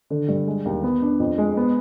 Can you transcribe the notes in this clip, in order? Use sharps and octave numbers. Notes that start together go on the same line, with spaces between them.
D3
G2
G#3
D#2
B3
D4
F2
G#3
B3